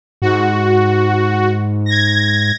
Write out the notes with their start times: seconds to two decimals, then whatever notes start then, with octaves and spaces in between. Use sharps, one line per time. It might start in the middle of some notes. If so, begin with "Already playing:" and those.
0.22 G#2 F#4
1.86 G#6 A#6